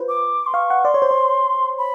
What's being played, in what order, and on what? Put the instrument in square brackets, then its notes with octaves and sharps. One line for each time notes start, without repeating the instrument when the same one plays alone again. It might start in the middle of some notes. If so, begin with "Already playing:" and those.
Already playing: [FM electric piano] F4 B4 C5
[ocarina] D6
C6
[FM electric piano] F5 [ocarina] C#6
[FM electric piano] F#5
[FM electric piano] D5 [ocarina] C6
[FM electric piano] C#5
C5
C#5
[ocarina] B5